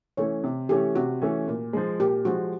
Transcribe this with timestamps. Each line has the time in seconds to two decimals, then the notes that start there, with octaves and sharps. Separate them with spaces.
0.17 E3 A3 C#4 C#5
0.44 C3
0.69 E3 A3 C#4 G4
0.96 C3 F#4
1.22 E3 A3 C#4
1.48 A#2
1.73 F3 G#3
2.00 A#2 G4
2.25 F3 G#3 F#4